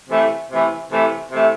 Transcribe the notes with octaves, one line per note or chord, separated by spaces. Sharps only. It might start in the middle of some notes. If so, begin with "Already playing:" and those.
C3 E3 A3
C3 E3 A3
C3 E3 A3
C3 E3 A3